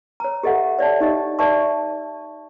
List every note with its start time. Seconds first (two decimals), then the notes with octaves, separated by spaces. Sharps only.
0.20 C#5 A#5
0.43 G4 A4 D#5 E5 F#5
0.79 C#5 D5 E5 A5
1.00 D#4 G4 D#5
1.39 D5 E5 A5 C#6